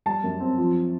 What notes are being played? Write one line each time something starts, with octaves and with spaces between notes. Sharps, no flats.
G3 A5
F#2
C4
F3